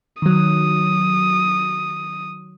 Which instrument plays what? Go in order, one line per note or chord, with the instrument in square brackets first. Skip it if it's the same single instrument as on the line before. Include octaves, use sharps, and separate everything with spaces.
[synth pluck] D#3 F#3 [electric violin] D#6